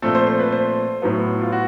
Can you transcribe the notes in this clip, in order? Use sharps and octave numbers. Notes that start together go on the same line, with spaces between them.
A#2 F3 A3 C4 A4
C5
C5
B4
C5
A2 F#3 B3
F4
F#4